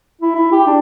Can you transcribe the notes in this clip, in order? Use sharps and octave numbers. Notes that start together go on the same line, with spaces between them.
E4
E4
G4
D4